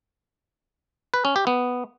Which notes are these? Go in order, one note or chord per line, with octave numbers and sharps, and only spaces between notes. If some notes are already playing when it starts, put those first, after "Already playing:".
B4
C#4
G4
B3